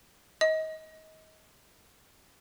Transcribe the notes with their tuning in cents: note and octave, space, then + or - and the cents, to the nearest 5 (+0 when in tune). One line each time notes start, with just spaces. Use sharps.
D#5 +25